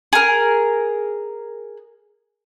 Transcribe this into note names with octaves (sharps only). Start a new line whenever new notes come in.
G#4 A#4